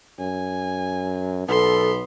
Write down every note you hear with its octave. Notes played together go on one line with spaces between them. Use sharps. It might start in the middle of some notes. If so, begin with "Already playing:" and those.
F#2 G#5
B1 B3 A4 C6